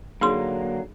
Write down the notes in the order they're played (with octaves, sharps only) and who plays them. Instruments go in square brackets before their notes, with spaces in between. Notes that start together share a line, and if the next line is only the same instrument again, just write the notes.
[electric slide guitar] D3 F#3 A#3 [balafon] D#4 G#4 C6